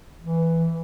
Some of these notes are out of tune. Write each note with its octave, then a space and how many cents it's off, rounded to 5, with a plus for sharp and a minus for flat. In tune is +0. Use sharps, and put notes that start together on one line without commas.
E3 +0